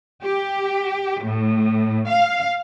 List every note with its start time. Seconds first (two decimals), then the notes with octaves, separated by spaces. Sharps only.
0.21 G4
1.22 A2
2.07 F5